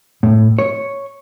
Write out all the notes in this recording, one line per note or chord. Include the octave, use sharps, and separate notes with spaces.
A2
C#5